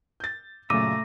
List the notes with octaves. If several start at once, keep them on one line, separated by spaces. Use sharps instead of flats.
G6 A6
F#2 A#2 C#3 A3 A#5 D6 E6 D#7